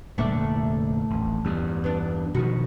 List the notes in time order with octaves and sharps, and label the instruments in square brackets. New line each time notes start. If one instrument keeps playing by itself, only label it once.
[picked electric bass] F1 A#2 D3 [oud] A3 D4 E5
[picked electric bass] D#1 A1
E2 G2
[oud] B3 D4
[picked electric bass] B2 D#3 F3 [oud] F#4